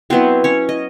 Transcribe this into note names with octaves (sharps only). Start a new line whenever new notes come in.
F#3 B3 C4 E4 C5
C#4 C#5
D#5